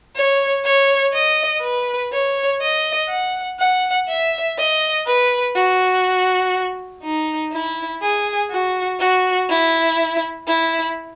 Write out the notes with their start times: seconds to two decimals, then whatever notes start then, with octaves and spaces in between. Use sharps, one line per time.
0.15 C#5
0.64 C#5
1.13 D#5
1.62 B4
2.12 C#5
2.61 D#5
3.09 F#5
3.59 F#5
4.08 E5
4.58 D#5
5.06 B4
5.55 F#4
7.03 D#4
7.52 E4
8.02 G#4
8.51 F#4
9.00 F#4
9.49 E4
10.47 E4